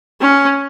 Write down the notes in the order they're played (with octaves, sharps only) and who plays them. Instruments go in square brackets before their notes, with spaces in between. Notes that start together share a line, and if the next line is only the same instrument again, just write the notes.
[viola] C#4